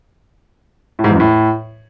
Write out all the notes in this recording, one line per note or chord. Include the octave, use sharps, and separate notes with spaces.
A2
G#2
E2
F#2
A2